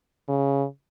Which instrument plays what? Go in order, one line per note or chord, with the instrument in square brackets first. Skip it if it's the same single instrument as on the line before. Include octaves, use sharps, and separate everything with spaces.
[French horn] C#3